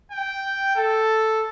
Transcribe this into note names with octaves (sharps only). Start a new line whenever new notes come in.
G5
A4